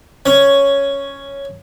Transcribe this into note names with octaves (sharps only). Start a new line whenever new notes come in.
C#4